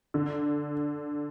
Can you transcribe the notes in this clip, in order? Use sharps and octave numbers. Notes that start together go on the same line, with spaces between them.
D3